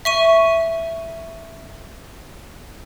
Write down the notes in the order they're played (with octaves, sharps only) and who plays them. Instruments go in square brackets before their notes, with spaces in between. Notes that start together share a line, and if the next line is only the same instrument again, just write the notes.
[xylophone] E5 C#6 D#7